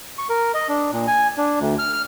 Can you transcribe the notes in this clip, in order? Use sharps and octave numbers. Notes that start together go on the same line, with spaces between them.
C#6
A#4
D#5
D4
A#2
G#5
D4
D2
F6
F6